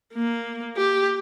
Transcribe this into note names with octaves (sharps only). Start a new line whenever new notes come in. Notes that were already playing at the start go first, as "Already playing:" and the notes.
A#3
G4